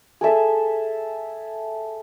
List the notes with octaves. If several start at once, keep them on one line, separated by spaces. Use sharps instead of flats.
G#4 A4 E5